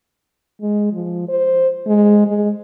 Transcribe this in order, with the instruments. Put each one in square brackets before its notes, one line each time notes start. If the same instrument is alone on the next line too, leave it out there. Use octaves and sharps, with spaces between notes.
[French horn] G#3
F3
C5
G#3
G#3